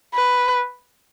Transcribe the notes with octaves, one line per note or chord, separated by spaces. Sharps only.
B4